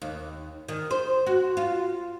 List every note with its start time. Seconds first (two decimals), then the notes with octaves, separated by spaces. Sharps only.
0.02 D#2
0.68 D#3
0.91 C5
1.27 F#4
1.57 F4